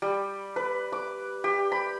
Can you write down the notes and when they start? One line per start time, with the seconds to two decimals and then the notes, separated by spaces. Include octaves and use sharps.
0.02 G3
0.56 B4
0.92 D6
1.44 G4
1.72 B5